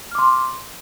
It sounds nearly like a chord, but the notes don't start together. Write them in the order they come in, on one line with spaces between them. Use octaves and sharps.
F6 D6 C6